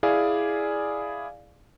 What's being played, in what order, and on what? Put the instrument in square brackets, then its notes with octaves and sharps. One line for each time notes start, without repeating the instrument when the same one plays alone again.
[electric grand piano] E4 G#4 D5 F5 G#5